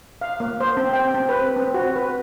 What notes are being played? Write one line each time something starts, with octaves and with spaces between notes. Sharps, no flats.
F5
A#3
C5
C4
G5
C4
B4
C4
F#4
B4